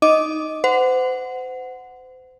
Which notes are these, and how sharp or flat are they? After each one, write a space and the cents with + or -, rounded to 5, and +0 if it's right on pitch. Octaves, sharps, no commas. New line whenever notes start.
D#4 +0 D#5 +5 D6 +0
C5 -35 F#5 +0